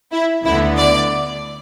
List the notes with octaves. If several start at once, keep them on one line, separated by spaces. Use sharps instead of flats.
E4
D2 D3 B3 E4
D5